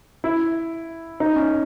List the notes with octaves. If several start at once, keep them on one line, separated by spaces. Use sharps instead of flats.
E4
D#4
C#4